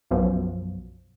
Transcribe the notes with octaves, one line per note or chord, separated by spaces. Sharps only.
B1 F#2 B2 F3